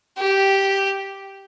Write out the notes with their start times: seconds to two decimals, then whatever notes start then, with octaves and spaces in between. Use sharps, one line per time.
0.18 G4